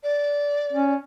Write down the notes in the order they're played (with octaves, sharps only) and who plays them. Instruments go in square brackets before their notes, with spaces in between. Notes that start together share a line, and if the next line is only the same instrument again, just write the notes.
[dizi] D5
[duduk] C#4